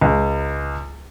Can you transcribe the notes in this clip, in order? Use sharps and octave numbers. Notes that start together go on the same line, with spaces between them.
C#2